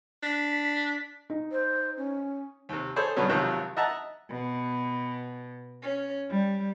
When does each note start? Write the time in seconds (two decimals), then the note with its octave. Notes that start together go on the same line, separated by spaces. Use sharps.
0.23 D4 B6
1.30 D#4
1.51 C5
1.97 C#4
2.69 D#2 C3
2.96 G#4 A4 C5 C#5
3.16 G2 B2 D3 F#3 B3 C#4
3.29 G#1 F2 C3 D#3 F3 F#3
3.77 D#5 E5 F#5 A5 A#5
4.30 B2
5.81 C#4
6.30 G3